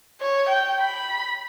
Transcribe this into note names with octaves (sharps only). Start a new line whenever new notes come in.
C#5
G5
B5